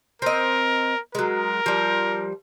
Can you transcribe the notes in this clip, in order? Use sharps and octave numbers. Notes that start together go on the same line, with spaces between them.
C4 A#4 D#5
F#3 G#3 A#4
F3 G3